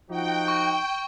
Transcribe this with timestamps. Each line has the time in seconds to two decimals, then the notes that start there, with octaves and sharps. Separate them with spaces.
0.11 F3 D#4 F#4 G5
0.48 C#6